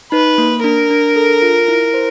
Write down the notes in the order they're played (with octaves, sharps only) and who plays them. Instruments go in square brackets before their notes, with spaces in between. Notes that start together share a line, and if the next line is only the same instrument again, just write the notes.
[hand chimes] D#4 [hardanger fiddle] B4
[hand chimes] A#3
[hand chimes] D4 [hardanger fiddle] A#4
[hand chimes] D4
A4
F4
E4
C5